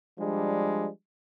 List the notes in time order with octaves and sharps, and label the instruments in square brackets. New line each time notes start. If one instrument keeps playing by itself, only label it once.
[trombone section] F3 G3 G#3 D4